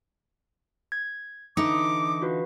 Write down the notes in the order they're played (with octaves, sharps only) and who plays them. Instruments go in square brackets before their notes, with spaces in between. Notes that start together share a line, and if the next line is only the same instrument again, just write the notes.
[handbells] G#6
[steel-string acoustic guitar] D3 E3 D#4 [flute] D6 [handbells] D#6 C#7
[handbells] F4 F#4 B4